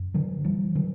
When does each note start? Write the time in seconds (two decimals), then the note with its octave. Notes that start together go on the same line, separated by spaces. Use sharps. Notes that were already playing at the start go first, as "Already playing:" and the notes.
Already playing: F#2
0.14 D3 F#3
0.44 E3 G3
0.75 D3 F#3